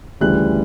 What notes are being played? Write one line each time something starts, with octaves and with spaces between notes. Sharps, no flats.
D2 C#3 E3 G3 F#6